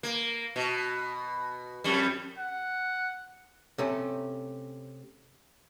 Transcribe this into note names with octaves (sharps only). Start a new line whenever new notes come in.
A#3
B2
F2 G3
F#5
C3 A3 C#4